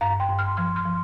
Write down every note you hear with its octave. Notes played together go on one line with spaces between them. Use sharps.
G2 F5 A#5
G5 C6
G2
C6 F6
F3 C6 F6
C6 F6
F3